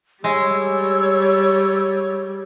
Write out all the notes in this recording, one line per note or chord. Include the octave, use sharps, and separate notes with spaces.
G3 G#3 C#5 E6